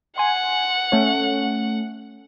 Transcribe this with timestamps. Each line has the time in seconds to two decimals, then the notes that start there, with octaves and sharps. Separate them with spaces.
0.18 F#5 G#5 C6
0.92 A3 C#4